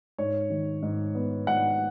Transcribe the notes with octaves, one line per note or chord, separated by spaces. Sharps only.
G#2 C#5
D#3
G#2
B3
G#2 F#5